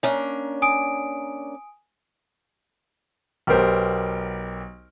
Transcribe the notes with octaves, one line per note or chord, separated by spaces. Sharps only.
A#3 C#4 D4 C#5
G#5 D#6 D7
B1 B3 G4 A#4 C5